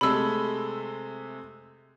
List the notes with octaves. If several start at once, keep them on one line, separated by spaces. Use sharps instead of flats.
C3 G#3 A3 B5 E6